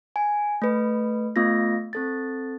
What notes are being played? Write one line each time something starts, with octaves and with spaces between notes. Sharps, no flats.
G#5
A3 B4
A3 B3 F4 A#6
C4 A4 A6